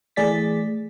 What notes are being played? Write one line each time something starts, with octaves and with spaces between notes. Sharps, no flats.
E3 A3 G#4 D5 A6 B6